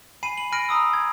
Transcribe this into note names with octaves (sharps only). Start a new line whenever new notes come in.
G#5 B5 C7 D#7
F#7
G#5 B5 F6 A#6 D7
A#5 D#6 E6
G#6